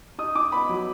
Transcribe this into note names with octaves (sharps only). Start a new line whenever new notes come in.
D#4 D#6
D#4 D6
B3 B5
F#3